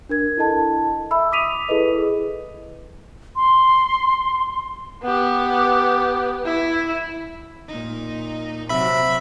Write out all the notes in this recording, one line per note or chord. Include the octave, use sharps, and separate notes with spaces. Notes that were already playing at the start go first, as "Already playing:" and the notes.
D4 A#4 G#6
E4 A4 D#5 A5
E5 B5 E6
D6 D#6 B6 D#7 F7
E4 G#4 A4 B4 D#5
C6
B3 G4
E4
A#2 D#4
C3 F#3 E5 B5